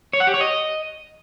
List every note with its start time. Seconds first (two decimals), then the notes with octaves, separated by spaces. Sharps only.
0.13 C#5
0.20 F#5
0.27 G4
0.34 C#5
0.41 D#5